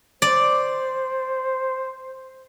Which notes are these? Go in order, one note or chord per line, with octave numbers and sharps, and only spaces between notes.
C5 D5